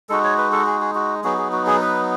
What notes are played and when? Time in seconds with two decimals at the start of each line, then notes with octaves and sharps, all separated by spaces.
0.09 G#3 D#4 F#4 A4
0.24 C#5
0.38 B4
0.52 A4
0.67 G#4
0.81 G#4
0.95 F#4
1.24 F#3 B3 D#4 F#4 G#4
1.38 G#4
1.52 F#4
1.67 G#4
1.81 B4